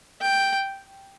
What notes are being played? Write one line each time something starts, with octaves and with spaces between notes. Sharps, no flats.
G5